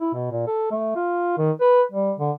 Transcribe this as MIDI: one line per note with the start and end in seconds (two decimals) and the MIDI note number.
0.01 0.12 64
0.14 0.29 47
0.31 0.45 46
0.47 0.71 69
0.72 0.94 57
0.96 1.33 65
1.38 1.52 51
1.61 1.82 71
1.92 2.13 55
2.19 2.32 50